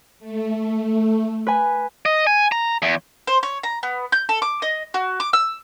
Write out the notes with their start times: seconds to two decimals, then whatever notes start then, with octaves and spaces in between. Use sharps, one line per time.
0.19 A3
1.47 B4 G#5
2.06 D#5
2.27 G#5
2.52 A#5
2.82 E2
3.27 C5
3.43 C#5
3.63 A#5
3.83 B3
4.12 G6
4.29 A4
4.42 D6
4.62 D#5
4.94 F#4
5.20 D6
5.33 E6